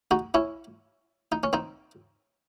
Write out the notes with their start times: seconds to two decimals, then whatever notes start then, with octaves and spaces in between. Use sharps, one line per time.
0.11 D#4 F#4
0.34 C#4 E4
1.32 D#4
1.43 C#4
1.53 C4 D#4